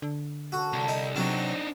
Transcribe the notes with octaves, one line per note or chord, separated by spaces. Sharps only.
D3
C#3 A#3 F#4 A4
C2 G2 D4 A5
D#4
C3 F#3 C4 D4 D#4 A#4 C5 F#5